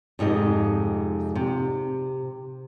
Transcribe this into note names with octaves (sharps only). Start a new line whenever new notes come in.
F2 G#2 C3 D#5
C3